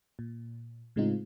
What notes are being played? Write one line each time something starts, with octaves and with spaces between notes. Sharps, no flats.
A#2
A2 C#3 G#3 C4 D#4 F4